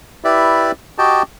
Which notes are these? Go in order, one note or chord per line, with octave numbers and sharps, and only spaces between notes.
E4 G4 B4 D5 E5
F#4 G4 D#5 G5 A5